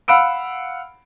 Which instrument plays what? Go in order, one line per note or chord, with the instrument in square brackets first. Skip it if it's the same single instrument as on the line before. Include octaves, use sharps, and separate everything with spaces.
[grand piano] F5 F#5 B5 E6 D7